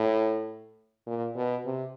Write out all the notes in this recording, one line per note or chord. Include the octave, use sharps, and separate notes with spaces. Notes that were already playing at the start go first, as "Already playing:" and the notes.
Already playing: A2
A#2
B2
C3